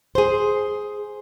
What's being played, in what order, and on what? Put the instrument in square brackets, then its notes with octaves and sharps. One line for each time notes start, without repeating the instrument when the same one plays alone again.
[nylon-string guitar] G#4 C5